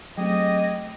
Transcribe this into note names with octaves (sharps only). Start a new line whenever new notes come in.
F#3 A3 C4 G4 G#4 D#5